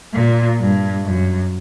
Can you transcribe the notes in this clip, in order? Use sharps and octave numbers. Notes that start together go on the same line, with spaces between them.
A#2
G2
F#2